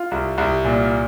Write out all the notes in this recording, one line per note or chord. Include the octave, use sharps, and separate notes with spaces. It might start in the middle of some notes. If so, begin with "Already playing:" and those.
Already playing: F4
C2
C2
A#2